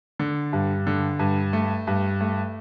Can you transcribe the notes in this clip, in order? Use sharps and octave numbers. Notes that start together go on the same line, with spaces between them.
D3
G2
D3
G2
A3
G2
A3